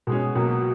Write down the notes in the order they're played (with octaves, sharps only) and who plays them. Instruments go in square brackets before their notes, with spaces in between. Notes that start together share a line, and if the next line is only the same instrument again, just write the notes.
[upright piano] B2 G#3 C#4
C#2 B2 F#3 A#3